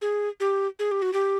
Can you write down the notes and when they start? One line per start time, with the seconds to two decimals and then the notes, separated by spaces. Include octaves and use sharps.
0.02 G#4
0.40 G4
0.79 G#4
0.91 G4
1.02 F#4
1.13 G4